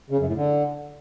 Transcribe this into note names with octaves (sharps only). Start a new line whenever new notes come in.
C#3
F#2
A2
D3